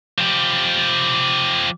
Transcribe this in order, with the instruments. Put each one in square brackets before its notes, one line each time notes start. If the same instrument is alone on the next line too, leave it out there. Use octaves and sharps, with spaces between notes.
[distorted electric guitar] F3 G4